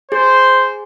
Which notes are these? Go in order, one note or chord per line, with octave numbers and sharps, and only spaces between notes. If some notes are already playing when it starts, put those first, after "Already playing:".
G#4 C5